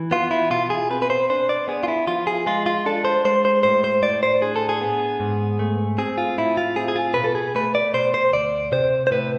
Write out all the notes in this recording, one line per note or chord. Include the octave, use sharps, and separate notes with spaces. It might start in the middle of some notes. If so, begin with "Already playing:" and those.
Already playing: E3
B3 F4
E4
B2 F4
G#4
C4 B4
B4
C5
D4 C5
D5
B3 G#4
F4
E4
F3 F4
G#4
G#3 F4
F4
D4 A4
C5
G#3 C5
C5
A2 C5
C5
A2 D5
C5
D4 G#4
A4
G#4
B3
G#2
A3
C4 G#4
F4
A2 E4
F4
C4 G#4
G#4
F4
B2 B4
A4
G#4
A3 B4
D5
B2 C5
C5
D2 D5
C3 C5
C5
A2 B4